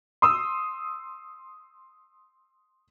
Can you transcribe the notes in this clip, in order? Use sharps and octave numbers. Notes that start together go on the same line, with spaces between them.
C6 D#6 E6